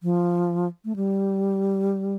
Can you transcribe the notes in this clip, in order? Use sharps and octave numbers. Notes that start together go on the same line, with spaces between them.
F3
A3
G3